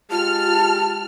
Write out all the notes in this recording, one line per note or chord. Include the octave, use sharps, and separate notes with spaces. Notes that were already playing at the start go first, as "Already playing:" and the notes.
G#3 F4 G4 A5 F6